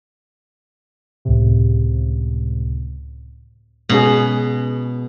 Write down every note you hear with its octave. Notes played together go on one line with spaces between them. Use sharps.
C#2 A2 C3
B2 G#3 C#4 G#4